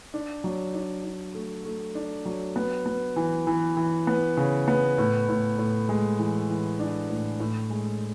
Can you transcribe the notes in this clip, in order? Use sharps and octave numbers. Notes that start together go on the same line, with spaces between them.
D4
F#3
D4
D4
A3
A3
D4
F#3
B3
B3
E3
E3
E3
B3
C#3
B3
A2
A2
A2
G#3
E3
E3
D4
A2
A2
G#3